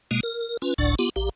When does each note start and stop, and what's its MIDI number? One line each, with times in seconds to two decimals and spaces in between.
0.11 0.20 47
0.11 0.20 56
0.11 0.20 58
0.23 0.57 70
0.62 0.74 61
0.62 0.74 65
0.62 0.74 71
0.78 0.95 31
0.78 0.95 37
0.78 0.95 45
0.78 0.95 62
0.78 0.95 74
0.78 0.95 78
0.99 1.09 59
0.99 1.09 65
0.99 1.09 67
1.16 1.29 34
1.16 1.29 67